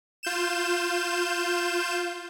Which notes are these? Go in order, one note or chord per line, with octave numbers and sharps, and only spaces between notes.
F4 G6 E7